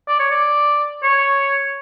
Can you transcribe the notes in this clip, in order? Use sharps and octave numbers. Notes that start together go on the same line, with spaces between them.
D5
C#5
D5
C#5